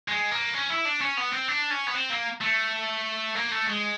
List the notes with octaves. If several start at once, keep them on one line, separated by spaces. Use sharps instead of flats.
G#3
A#3
C#4
E4
D4
C#4
B3
C4
D4
C#4
B3
C4
A#3
A3
A#3
A3
G#3